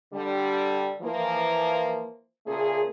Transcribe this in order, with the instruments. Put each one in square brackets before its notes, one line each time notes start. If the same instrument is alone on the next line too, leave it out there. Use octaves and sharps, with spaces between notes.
[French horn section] D3 G3
E3 F3 A#3
A#2 C#3 A3 G#4